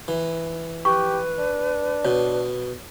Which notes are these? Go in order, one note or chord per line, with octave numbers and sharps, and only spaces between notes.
E3
G4 B4 C#6
D4
B2 C#5